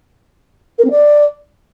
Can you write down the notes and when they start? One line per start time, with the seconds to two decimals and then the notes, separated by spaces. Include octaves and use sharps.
0.78 A#4
0.84 C4
0.91 D5